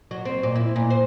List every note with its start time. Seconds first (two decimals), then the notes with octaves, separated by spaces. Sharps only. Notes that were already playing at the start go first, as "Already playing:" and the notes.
0.11 F#3
0.25 C4
0.43 A#2
0.56 E4
0.76 A#2
0.90 C5